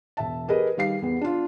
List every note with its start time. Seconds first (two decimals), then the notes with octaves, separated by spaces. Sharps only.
0.17 E1 E5 A5
0.48 G4 G#4 A#4 B4 D#5
0.77 D#3 G3 F5 C7
1.02 E2 B3
1.21 D4 F4